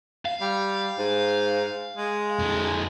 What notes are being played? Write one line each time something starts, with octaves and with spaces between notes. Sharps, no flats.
F5
G3
G#2
G#3
F2 D3